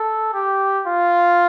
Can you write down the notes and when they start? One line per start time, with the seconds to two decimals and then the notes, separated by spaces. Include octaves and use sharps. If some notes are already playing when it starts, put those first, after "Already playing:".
Already playing: A4
0.34 G4
0.87 F4